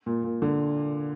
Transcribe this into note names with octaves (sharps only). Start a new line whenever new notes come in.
A#2
A#2
D3